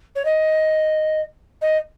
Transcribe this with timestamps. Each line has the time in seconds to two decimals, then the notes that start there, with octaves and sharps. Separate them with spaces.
0.15 C#5
0.25 D#5
1.61 D#5